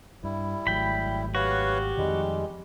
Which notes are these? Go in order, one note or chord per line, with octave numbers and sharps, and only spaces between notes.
G2 G3 E4
G#1 F#3 A3 G5 B5
F#4 G4 B4 C#5 F5
F2 D#3 F3 G3 G#3